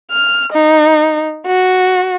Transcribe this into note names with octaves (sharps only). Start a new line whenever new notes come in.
F6
D#4
F#4